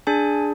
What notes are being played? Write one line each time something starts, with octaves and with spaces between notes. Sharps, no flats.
D4 G#4 G#5